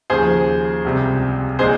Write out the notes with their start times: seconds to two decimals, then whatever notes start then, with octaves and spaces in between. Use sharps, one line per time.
0.10 D#2 C#3 F3 G#4 C5
0.85 C#2 C3 G3 C4
1.59 A#2 G#3 C4 G#4 C5